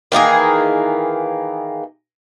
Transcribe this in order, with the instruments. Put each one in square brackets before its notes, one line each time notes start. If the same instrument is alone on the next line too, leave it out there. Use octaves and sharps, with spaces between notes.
[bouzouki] D#3 E3 A#3 G#4